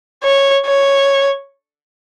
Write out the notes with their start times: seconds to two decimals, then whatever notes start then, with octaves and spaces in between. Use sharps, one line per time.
0.23 C#5
0.66 C#5